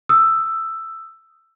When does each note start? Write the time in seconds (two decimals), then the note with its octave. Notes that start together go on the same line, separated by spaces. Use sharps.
0.09 D#6 E6